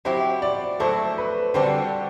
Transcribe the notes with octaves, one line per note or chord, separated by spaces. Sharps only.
F#3 C4 E4 G4 C5
D5
F#3 A3 E4 A4 C5
B4
D3 G3 C4 F#4 A4 C5